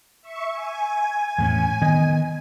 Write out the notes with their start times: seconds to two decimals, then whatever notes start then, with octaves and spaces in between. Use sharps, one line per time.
0.22 E5 C#6
0.51 G#5
1.38 E2 A2 C#4
1.82 D#3 B3 D#5